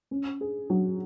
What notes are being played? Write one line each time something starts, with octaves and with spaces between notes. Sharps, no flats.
C#4
G#4
F#3